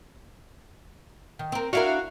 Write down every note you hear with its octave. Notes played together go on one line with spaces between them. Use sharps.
D#3
C4 A#4
D4 E4 F#4 A#4 F5